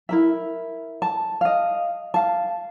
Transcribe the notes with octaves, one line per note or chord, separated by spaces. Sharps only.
E4 A#4 E5
A5
D#5 F5
F5 A5